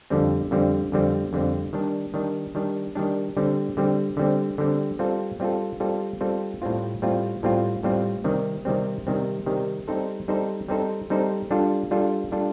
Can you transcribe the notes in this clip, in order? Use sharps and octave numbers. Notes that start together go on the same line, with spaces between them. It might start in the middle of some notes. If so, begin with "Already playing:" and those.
F2 D3 G3 C4
F2 D3 G3 C4
F2 D3 G3 C4
F2 D3 G3 C4
D#3 G3 D4
D#3 G3 D4
D#3 G3 D4
D#3 G3 D4
D3 G3 C4
D3 G3 C4
D3 G3 C4
D3 G3 C4
G3 C4 F4 A4
G3 C4 F4 A4
G3 C4 F4 A4
G3 C4 F4 A4
A2 G3 C4 F4
A2 G3 C4 F4
A2 G3 C4 F4
A2 G3 C4 F4
C3 D#3 G3 C4
C3 D#3 G3 C4
C3 D#3 G3 C4
C3 D#3 G3 C4
G3 C4 D#4 A4 C5
G3 C4 D#4 A4 C5
G3 C4 D#4 A4 C5
G3 C4 D#4 A4 C5
G3 D4 F4 A4
G3 D4 F4 A4
G3 D4 F4 A4